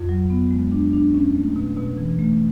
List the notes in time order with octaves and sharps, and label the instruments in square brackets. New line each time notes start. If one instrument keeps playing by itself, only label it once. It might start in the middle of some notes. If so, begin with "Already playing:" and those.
Already playing: [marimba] F2
F#3
B3
G#3
D4
D4
C#4
A3
B2
B2
E3
A3